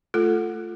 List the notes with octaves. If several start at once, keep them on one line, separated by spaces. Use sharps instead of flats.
A3 F4 A4